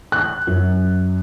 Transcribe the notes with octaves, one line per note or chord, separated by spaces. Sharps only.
F#6
F#2